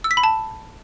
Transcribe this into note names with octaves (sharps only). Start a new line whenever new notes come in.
E6
B6
B5
A5